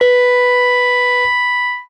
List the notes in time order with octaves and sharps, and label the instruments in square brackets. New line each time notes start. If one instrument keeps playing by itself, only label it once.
[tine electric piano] B4 [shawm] B5